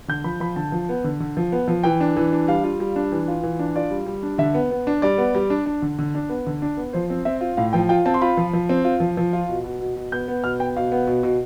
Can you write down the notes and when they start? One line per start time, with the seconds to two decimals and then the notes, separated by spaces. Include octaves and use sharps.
0.08 D3 G6
0.24 F3 B5
0.40 F3 B5
0.56 D3 A5
0.72 F3
0.89 B3
1.04 D3
1.20 D3
1.37 F3
1.52 B3
1.68 F3
1.83 E3 G5
2.00 D4
2.17 E3
2.32 D4
2.48 G3 F5
2.64 F4
2.80 G3
2.96 D4
3.12 E3
3.28 F4
3.43 E3
3.59 D4
3.76 F4 D5
3.90 G3
4.06 G3
4.23 D4
4.38 D3 E5
4.54 B3
4.71 B3
4.87 D4
5.02 G3 D5
5.18 B3
5.35 G3
5.50 D4
5.66 D4
5.82 D3
5.99 D3
6.15 D4
6.29 B3
6.46 D3
6.62 D4
6.77 B3
6.93 F3 C5
7.10 C4
7.25 C4 E5
7.41 F4
7.57 A2 F5
7.73 F3 G5
7.89 F4 G5
8.06 C4 A5
8.14 C6
8.21 F4 B5
8.37 F3
8.53 F3
8.69 C4
8.85 F4
9.00 F3
9.17 F3
9.33 F4
9.49 B2
9.64 B2
9.80 B2
9.96 B2
10.12 B3 G6
10.28 B3
10.43 B2 F6
10.59 B3 G5
10.76 B2 F5
10.92 B3
11.07 B2
11.23 B2